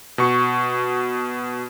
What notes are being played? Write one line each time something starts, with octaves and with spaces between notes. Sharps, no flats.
B2 C#6